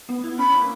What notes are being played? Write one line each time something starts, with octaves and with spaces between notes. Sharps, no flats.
B3
E4
C#4 B5
A#3